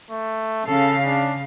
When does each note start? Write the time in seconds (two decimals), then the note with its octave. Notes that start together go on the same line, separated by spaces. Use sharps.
0.11 A3
0.66 C#3 A4 F5
1.05 D4